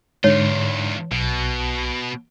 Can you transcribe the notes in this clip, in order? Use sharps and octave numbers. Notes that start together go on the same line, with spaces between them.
E2 G#2 D3 F4 C#5
B1 B2